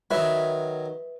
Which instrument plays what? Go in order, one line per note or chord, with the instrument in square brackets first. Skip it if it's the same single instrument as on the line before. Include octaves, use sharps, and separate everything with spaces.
[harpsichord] D#3 F#3 G#5 [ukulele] B4 E5